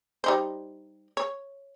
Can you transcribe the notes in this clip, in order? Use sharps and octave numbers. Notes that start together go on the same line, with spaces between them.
G3 D#4 C5
C#5